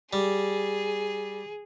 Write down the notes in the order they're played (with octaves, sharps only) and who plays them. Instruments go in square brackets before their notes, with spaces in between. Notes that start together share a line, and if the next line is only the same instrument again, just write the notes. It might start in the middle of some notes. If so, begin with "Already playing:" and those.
[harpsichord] G3 [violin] G#4